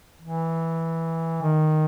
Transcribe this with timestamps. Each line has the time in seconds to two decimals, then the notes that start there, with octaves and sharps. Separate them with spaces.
0.21 E3
1.42 D#3